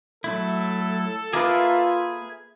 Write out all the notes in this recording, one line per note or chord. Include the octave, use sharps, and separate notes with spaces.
F#3 A3 E4 A4
A#3 F4 G#4 B4 E5 F6